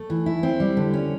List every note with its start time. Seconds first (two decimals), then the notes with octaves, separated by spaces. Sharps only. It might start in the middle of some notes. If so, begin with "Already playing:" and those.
Already playing: A3
0.10 E3
0.26 E4
0.43 C4
0.60 G3
0.77 D3
0.93 C#4